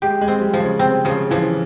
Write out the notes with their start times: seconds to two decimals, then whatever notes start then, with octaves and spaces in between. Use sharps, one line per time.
0.02 G#3 G4
0.21 G#3
0.28 C4
0.41 G3
0.53 F3
0.60 C#3
0.79 C3 C4
1.05 C#3 F3
1.31 E3 F3